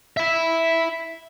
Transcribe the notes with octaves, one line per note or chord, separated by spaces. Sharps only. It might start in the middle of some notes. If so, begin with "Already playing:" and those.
E5 B5